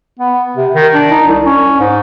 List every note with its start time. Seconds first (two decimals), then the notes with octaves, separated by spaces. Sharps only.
0.19 B3
0.57 C3
0.75 D#3
0.94 D4
1.11 D#4
1.27 C2
1.45 C#4
1.80 G#2